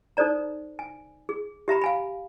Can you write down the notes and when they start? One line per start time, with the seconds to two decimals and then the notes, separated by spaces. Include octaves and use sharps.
0.17 D#4 A4 C5 D5 A#5
0.79 G#5
1.29 G#4
1.68 G4 E5 A#5 B5
1.82 F5 G#5 B5